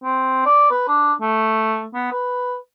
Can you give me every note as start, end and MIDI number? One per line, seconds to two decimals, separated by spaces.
0.03 0.41 60
0.45 0.70 74
0.71 0.87 71
0.88 1.13 62
1.21 1.86 57
1.94 2.12 59
2.12 2.57 71